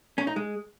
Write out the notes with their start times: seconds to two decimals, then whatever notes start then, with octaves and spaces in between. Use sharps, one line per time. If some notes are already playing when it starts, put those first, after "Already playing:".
0.18 C#4
0.27 D#4
0.36 G#3